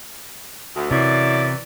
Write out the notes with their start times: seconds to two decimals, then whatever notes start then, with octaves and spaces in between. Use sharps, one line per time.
0.75 D2
0.91 F#2 C3 E3 D5